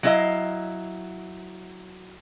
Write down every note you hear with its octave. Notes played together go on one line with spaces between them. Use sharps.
F#3 D4 E4 A4 D#5 F5